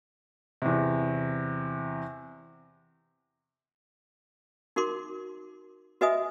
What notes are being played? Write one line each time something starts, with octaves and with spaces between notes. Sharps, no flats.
E2 C3
D#4 F#4 A#4 C6 D6
F#4 B4 D#5 E5 G#5 D#6